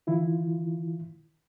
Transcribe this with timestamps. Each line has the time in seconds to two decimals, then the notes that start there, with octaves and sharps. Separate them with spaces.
0.07 D#3 E3 E4 F4